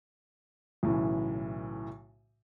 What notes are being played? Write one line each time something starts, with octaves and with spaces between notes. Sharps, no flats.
B1 A2 C#3 E3